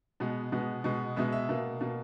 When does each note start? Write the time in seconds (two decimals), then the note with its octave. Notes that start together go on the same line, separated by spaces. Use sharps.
0.20 B2 G#3 B3
0.52 B2 G#3 B3
0.84 B2 G#3 B3
1.16 B2 G#3 B3 E5
1.32 E5
1.49 B2 A#3
1.81 B2 A#3